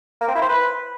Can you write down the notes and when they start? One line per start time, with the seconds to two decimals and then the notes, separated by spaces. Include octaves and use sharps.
0.21 A#3
0.28 C4
0.35 E4
0.42 C5
0.49 B4